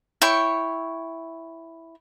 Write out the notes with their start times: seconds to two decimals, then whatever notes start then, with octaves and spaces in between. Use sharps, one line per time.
0.22 E4 C#5 G5 C#6